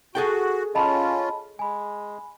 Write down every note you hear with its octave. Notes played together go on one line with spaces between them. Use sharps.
F#4 G#4 A4 G5
C#4 F4 D#5 A5 B5
G#3 G#5 B5